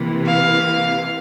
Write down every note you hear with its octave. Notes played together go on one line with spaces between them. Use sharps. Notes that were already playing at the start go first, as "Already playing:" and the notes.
Already playing: C3 E3 A#3
F5